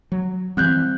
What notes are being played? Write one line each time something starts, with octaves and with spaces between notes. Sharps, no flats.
F#3
E3 G3 C4 F#6 G6